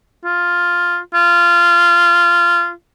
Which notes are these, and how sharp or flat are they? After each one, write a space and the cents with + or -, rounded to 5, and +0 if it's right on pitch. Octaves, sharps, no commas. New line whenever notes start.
F4 +5
F4 -15